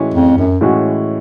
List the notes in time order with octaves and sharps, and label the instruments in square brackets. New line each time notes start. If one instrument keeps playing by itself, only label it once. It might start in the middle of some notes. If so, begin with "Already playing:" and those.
Already playing: [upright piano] A2 E3 G#3 C#4 F#4
[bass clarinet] F2
F#2
[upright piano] A2 E3 G#3 C#4 F#4